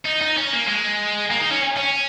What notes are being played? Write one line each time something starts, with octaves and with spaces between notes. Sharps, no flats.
D#4
D#4
C#4
A#3
G#3
A#3
D#4
C#4
C#4